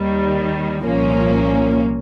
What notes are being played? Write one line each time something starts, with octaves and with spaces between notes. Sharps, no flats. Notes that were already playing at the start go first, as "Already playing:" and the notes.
Already playing: D#2 D#3 G3
C2 A#2 F3 A#3 C#4